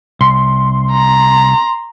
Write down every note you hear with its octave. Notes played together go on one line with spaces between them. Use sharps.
C2 C6
A#5